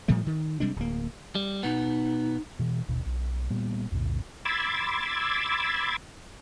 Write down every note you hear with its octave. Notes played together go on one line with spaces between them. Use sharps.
A2 F3 G3 A3
D#3
C3 G3 G#3 D4
D1 A#3
G3
B2 B3 D#4
B2 E3
D#1 G#1 D#2 B2
B1
A#2 G3 A#3 B3
B1 E2 A2 C#3
B5 C6 D6 E6 G#6 A6